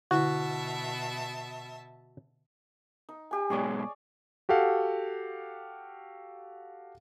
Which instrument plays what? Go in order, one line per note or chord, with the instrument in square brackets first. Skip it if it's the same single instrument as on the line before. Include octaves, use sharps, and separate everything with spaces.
[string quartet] B2 E5 A5 [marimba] D3 E4 [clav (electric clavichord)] F#4
[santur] D#4
G4 G#5
[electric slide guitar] G#2 B2 G#3 [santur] G#4 C#5 D5
[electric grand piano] F#4 G4 A4 F5 F#5